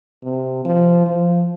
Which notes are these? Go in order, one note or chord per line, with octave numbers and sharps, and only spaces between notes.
C3
F3
F3